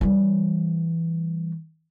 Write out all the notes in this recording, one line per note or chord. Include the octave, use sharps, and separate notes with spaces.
E3 G3